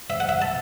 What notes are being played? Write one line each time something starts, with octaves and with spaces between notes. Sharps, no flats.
E5
F#5
E5
A5